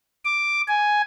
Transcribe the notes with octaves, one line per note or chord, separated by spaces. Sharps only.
D6
G#5